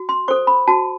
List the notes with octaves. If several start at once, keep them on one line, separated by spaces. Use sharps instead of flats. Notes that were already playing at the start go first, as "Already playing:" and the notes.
Already playing: F#4
C6
A4 C5 C#6
B5
F#4 A5